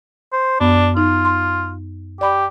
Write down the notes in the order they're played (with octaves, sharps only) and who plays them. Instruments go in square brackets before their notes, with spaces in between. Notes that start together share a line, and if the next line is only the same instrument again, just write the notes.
[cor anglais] C5
[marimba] F#2 B3 [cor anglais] D4
[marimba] D#4 [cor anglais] F4
[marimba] C6
[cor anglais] G4 [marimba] D5 B5